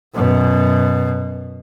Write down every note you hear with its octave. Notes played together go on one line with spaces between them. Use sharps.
F#2 B2